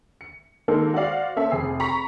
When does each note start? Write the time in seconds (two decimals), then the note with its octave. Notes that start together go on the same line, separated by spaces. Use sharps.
0.21 C#7
0.68 D#3 G#3 A#3 A4
0.94 F#4 C5 D5 F5
1.36 A#3 C#4 A4 C5 E5
1.51 F1 G#4 C7
1.80 A#5 B5 C#6 B6